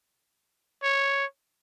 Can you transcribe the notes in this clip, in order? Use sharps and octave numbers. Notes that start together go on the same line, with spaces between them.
C#5